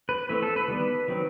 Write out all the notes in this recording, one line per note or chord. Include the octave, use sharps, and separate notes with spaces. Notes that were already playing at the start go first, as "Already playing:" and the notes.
B4
E3 A3 C4 B4
A4
B4
D#3 G3 B3
D#3 F#3 C4